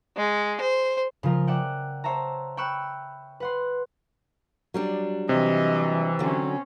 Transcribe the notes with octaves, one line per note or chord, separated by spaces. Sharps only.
G#3
C5
C#3 F3 F4 A#4
D5 E5 F#5 G5
C5 C#5 E5 A5 A#5
G5 B5 C#6 E6 F#6
B4 F#5 C6
F#3 G3 D4
C3 E3 D#5
D3 F#3 C4 C#4